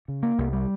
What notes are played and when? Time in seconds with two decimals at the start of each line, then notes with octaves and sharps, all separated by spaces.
0.08 C#3
0.23 A#3
0.38 C2
0.53 G3